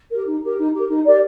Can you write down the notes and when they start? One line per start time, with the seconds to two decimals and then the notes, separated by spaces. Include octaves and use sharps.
0.10 G4 A#4
0.26 D#4
0.42 G4 A#4
0.57 D#4
0.74 G4 A#4
0.89 D#4
1.04 G4 A#4 D5